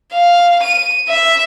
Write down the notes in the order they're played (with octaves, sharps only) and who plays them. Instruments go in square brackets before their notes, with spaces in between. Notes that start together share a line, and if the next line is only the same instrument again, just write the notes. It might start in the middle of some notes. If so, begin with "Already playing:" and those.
[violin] F5
D#7
E5